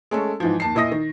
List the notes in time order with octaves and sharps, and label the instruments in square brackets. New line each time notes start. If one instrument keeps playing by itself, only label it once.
[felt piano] G#3 A3 C#4 A4
G#2 E3 F3
D#2 A5 C7
A#2 E4 D#5 D#6 A#6
D#3